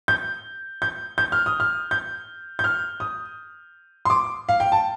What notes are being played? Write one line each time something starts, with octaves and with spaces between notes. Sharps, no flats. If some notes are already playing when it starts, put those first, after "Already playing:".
G6
G6
G6
F6
D#6
F6
G6
G6
F6
D#6
C6
D6
F5
G5
A5